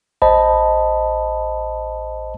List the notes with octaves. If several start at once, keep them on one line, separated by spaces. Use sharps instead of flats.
A1 C5 D#5 A5 B5